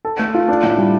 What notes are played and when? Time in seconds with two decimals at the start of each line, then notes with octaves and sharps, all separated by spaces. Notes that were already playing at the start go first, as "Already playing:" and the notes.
0.05 A4
0.19 A3
0.34 F4
0.48 D4
0.63 A2
0.78 G3